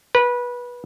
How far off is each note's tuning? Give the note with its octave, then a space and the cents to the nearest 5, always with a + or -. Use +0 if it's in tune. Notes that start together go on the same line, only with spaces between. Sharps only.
B4 -20